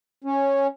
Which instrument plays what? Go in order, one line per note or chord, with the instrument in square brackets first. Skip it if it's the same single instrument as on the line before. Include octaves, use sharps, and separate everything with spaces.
[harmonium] C#4